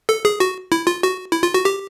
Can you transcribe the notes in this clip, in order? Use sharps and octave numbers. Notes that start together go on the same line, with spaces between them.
A4
G#4
F#4
E4
F4
F#4
E4
F4
F#4
G4